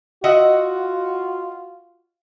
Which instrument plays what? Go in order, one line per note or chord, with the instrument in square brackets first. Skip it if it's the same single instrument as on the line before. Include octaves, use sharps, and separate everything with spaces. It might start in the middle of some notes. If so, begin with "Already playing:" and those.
[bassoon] F4 [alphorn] F#4 [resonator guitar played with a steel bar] D#5 E5 F#5